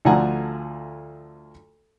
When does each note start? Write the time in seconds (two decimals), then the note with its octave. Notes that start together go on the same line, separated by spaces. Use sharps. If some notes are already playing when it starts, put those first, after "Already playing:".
0.05 D2 F3 A3 F#5 G#5 A#5